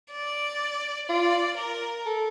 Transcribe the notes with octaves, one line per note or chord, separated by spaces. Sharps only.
D5
F4 D5
A#4
A4